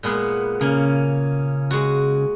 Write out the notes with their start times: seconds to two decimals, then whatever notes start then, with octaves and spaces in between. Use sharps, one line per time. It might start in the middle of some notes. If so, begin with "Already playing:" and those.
0.03 A#2 G#3 B3
0.61 C#3 A#3 C#4
1.71 G#3 F#4